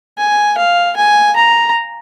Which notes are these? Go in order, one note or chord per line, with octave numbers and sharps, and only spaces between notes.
G#5
F5
G#5
A#5